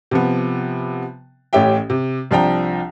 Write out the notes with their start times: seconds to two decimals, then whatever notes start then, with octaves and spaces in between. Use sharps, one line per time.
0.11 C3 F3 B3
1.53 A1 A2 C#4 G4 E5 G5
1.90 C3
2.31 C2 F3 D4 G5 A#5